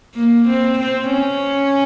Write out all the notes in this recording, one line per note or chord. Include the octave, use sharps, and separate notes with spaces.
A#3
C4
C4
C#4